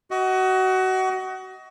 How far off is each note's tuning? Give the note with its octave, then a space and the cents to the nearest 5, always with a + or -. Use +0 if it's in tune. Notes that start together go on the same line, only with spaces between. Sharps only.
F#4 +25 D#5 +25